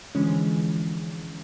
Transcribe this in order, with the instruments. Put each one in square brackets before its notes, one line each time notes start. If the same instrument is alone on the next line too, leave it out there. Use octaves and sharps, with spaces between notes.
[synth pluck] D3 E3 F3 G#3 C#4